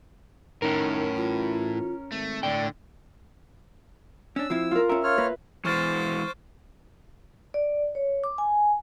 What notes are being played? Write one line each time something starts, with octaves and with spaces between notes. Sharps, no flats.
A2 D#3 C#4 A#4
E3 F4
G#1 A3
A2 D3 D5 G5
C#4 D4 E6
F3 C4 E4
F4 A#4
C#4 A#4 E5
F4 C#5 F6
A#3 B4
E3 G#3 C5 C#6 D6 F6 A6
D5
C#5
D6
G#5